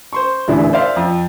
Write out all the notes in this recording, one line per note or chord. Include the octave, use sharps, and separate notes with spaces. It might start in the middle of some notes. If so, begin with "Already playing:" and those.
C5 C6 C#6
D#1 A1 D3 E3 D4 E4
C5 D5 E5 F5 C6
F2